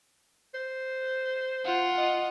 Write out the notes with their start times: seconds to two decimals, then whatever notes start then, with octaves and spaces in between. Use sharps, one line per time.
0.54 C5
1.64 F4 F#5
1.98 D#5